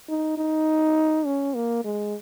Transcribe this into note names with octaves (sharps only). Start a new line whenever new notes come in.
D#4
D#4
C#4
A#3
G#3